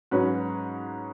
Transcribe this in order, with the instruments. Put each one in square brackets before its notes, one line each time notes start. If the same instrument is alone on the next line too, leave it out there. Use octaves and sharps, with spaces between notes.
[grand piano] G#2 F#3 C#4 F#4 B4